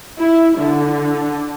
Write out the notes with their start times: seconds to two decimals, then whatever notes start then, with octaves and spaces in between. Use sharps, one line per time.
0.19 E4
0.58 D3